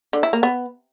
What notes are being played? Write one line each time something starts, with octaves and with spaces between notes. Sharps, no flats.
D3
E4
A#3
B3